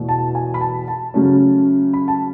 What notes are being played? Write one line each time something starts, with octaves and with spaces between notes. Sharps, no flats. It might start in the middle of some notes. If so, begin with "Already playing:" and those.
Already playing: E2 B2 A3
A5
G#5
B5
A5
A5
C#3 F#3 A3 C#4
B5
A5